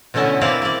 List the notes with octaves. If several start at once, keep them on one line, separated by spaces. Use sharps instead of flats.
B2 D3 A3 C#4 E4 D#5
A#3 C4 E4 D5 F5
A#3 D5